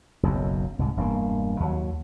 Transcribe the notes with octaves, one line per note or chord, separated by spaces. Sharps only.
F#1 B1 F#2
C2 G#2
E1 G2 G#3 A#3
D#2 F#3